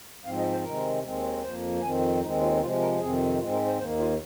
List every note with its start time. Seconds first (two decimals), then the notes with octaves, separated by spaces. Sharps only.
0.25 G#2 F3 C4 F5
0.37 D#5
0.51 C5
0.64 C3 D#3 G#3 C4 A#4
1.03 D#2 D#3 G#3 C4
1.43 F2 F3 A#3 C5
1.82 F2 D#3 C4 G#5
2.21 D#2 D#3 G#3 C4 D#4
2.41 F4
2.61 C3 F3 G#3 F4
2.80 A#4
2.99 F2 C3 D#3 C4 G#4
3.39 G#2 G#3 C4 F4
3.53 A#4
3.66 C5
3.78 D#2 D#3 A#3 C5
3.99 F4